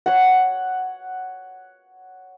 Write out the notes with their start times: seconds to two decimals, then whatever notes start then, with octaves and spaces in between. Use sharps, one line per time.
0.06 C#5 F#5